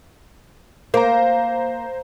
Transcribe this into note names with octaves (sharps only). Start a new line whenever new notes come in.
A#3 C5 A#5